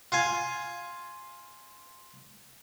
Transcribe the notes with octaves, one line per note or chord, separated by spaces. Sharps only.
F4 F5 G#5